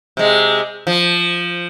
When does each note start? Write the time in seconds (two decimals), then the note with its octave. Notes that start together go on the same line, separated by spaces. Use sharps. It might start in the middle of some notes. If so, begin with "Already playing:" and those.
0.17 C3 G#3
0.87 F3